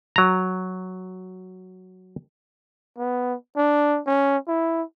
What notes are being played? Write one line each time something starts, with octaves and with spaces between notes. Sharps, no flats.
F#3 A#5
B3
D4
C#4
E4